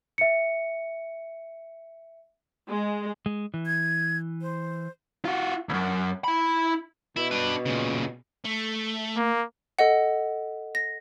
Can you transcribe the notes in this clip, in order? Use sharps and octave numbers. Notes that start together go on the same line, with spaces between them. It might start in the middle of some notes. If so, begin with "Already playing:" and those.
E5 C#7
G#3
G#3
E3
G#6
C5
F4 F#4
C#2 F#2
E4 B5
B2 E4
D4 B4
A#2 C#3
A3
A#3
A4 D#5 F#5
A#6